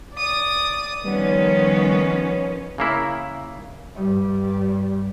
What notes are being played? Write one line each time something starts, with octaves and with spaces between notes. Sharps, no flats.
D5 D#6
D#3 F3 G3 B3 C#4 C#5
C#3 A#3 E4
G2 G3